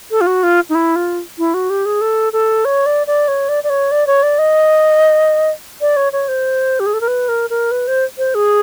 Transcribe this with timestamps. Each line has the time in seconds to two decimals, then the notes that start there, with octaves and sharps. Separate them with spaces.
0.11 A4
0.21 F4
0.27 F#4
0.43 F4
0.69 D#4
0.75 E4
0.96 F4
1.39 E4
1.54 F#4
1.70 G4
1.86 G#4
2.01 A4
2.33 A4
2.65 C#5
2.86 D5
3.07 D5
3.28 C#5
3.49 D5
3.64 D5
3.70 C#5
3.92 D5
4.07 C#5
4.23 D5
4.39 D#5
5.81 D5
5.96 C#5
6.13 C#5
6.28 C5
6.80 G4
6.86 G#4
6.94 A4
7.01 A#4
7.08 B4
7.29 A#4
7.50 A#4
7.71 B4
7.88 C5
8.18 C5
8.35 G#4